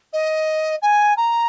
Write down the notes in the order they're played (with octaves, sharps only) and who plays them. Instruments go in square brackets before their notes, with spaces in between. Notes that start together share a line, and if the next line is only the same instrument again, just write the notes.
[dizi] D#5
G#5
A#5